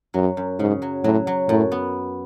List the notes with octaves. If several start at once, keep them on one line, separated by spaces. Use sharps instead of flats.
F#2 F#3
F#2
G#2 C#3
F#3
A2 F#3
F#3
F#2 A2
B3